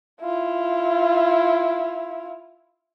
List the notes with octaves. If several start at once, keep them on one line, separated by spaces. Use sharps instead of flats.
E4 F4